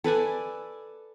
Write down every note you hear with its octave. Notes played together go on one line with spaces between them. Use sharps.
A4 B4 D5 G#5